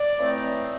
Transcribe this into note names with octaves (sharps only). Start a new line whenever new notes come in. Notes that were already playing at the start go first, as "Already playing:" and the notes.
Already playing: D5
A2 E3 A3 C4 D#4